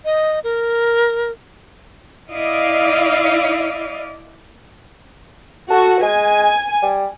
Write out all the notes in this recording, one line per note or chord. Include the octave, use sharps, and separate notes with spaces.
D#5
A#4
E4 D5 D#5 F5
F#4 A4
G#3 G#5
G3